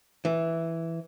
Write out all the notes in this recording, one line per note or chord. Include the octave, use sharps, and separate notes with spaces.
E3